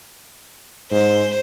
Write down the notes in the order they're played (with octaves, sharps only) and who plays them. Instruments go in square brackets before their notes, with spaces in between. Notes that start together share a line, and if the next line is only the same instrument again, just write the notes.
[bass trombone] G#2 [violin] C5